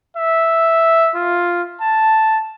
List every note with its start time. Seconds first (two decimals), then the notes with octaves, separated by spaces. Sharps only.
0.17 E5
1.16 F4
1.81 A5